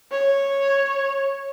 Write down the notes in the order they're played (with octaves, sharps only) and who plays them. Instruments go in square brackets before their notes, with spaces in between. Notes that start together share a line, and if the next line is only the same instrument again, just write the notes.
[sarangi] C#5